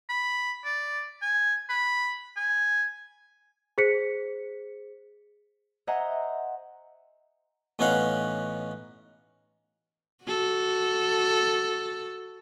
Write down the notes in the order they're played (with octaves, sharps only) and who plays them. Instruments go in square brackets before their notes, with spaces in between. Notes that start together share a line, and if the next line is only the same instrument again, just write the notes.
[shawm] B5
D5
G#5
B5
G#5
[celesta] G#4 C5 B6 C#7
[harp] C5 D#5 E5 F#5 G#5 A#5
[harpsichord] A1 B3 C#4 D#4 F5 F#5
[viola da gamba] F#4 A4